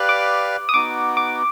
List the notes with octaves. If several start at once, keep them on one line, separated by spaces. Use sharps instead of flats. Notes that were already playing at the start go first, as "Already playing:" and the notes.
Already playing: G4 B4 D5 F5 F#6
D6
D#6
B3 D#4 F#4 D6
D6